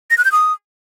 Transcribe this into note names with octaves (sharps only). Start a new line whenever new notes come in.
A#6
F#6
G6
D#6